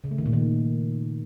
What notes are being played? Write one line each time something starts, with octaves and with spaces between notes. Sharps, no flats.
C#3
A3
D#3
A#2
D#3